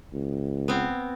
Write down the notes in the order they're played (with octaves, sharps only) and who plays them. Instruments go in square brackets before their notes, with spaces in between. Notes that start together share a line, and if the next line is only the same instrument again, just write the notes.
[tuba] C#2
[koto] B3 C4